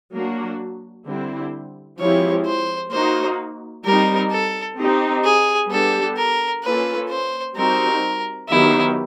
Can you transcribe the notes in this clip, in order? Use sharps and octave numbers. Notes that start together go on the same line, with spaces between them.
F#3 A#3 D4 F#4
D3 G3 C4 E4
F3 G#3 C4 E4 G4 C#5
C5
A#3 D#4 F#4 C5
G3 C4 D#4 A#4
A4
C4 D#4 G4
G#4
G3 B3 D4 G4 A4
A#4
A#3 C#4 F4 A4 B4
C5
G3 C4 D#4 F#4 A#4
D#3 F#3 B3 D#4 E4 G4